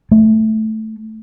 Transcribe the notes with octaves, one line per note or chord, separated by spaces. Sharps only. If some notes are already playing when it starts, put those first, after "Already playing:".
A3